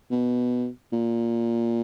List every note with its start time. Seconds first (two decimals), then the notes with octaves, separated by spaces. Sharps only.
0.11 B2
0.92 A#2